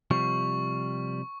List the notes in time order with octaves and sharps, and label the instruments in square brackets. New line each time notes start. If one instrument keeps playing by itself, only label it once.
[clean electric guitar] C3 F3 G3 [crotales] C#6